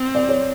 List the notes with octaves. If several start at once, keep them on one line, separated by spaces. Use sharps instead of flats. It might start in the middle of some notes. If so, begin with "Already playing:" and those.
Already playing: C4
D5
C#5